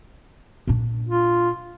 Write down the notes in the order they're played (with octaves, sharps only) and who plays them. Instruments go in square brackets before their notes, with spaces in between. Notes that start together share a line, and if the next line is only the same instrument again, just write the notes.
[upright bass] A#2 D4
[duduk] F4